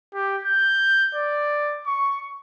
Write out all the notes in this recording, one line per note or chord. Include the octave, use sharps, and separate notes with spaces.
G4
G6
D5
C#6